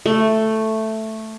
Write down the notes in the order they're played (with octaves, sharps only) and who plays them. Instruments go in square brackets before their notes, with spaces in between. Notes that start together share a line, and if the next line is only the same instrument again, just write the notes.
[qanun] A3